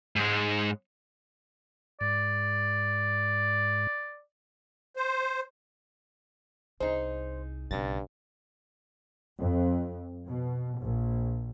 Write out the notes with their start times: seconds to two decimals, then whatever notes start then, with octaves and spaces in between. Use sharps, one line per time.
0.16 G#2 G#3
2.01 G#2 D5
4.96 C5
6.80 C2 D#4 G#4 C5
7.71 B1 G2 C#3 A6 A#6
9.39 F2
10.26 B2
10.80 A#1